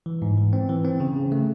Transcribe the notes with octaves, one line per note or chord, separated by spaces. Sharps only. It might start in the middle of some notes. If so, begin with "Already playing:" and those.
E3
G#2
E3
C4
E3
C4
C#3
C#3
A3